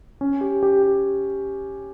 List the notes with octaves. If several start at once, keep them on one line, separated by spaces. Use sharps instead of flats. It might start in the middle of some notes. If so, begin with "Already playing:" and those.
C#4
G4
G4
G4